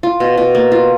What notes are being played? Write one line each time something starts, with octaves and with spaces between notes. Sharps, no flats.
F4
B2
B2
A#3
F4